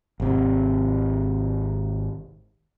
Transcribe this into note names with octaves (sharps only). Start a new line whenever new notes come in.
G#1 C3